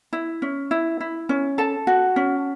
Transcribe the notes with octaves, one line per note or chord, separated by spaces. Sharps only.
E4
C#4
E4
E4
C#4
A4 A5
F#4
C#4